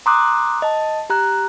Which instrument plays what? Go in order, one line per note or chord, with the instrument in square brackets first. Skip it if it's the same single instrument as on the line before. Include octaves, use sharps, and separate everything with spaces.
[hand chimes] A#5 C6 D6 D#6 F#6
D#5 A5
G4 A#5 F#6